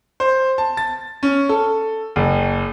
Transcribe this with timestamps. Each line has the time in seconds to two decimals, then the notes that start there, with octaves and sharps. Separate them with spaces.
0.20 C5
0.58 A5
0.77 A6
1.23 C#4
1.49 A4
2.16 F#1